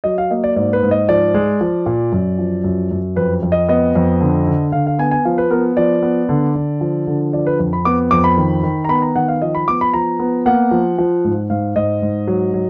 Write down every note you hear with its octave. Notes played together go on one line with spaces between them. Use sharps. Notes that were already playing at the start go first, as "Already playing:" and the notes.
F#3 D#5
F5
A#3 D#5
D5
G#2 D5
B4
G#2
D#5
F3 D5
G#3
F3
A#2
F#2
F3
F#2
F#2
F2 B4
F2
D#5
B3 D#5
F2
D3
D3
D3 F5
F5
B3 G#5
G#5
F3 F5
B4
B3 A#4
F3 D5
B3
D3
D3
F3
D3
F3 D5
B4
F2
B5
B3 D6
F2 D6
B5
D#3
D#3
A#5
B3 B5
A#5
D#3 F#5
F5
F3 D#5
B5
B3 D6
B5
F3 A#5
B3
A#3 F#5
F3
F3
G#2
G#2 F5
G#2 D#5
G#2
F#3
F#3